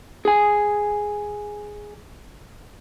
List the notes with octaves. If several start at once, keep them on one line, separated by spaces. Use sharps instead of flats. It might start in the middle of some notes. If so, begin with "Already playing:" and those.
G#4 G#5